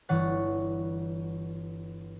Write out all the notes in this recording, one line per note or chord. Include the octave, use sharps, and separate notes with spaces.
G1 E3 C#5 F#5 A6